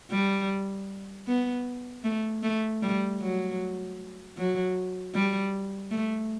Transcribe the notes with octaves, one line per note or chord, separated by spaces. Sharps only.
G3
B3
A3
A3
G3
F#3
F#3
G3
A3